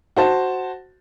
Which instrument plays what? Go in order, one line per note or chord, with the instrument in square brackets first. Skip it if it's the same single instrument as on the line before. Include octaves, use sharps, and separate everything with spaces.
[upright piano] F#4 C5 A5